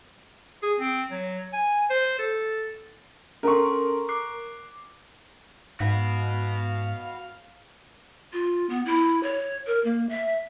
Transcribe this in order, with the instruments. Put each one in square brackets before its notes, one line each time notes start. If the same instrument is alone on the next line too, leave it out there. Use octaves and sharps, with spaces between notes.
[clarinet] G#4
C4
F#3
G#5
C5
A4
[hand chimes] C#4 A4 C6 [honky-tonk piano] A#4 C#6
[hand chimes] D6 F#6 C7
[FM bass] G#2 [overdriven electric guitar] F#4 B4 [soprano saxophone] F5
[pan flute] F4
B3
E4
C#5
A#4
A#3
E5